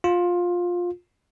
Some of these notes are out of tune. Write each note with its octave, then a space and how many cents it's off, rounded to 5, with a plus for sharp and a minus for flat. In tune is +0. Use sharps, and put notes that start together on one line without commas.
F4 +15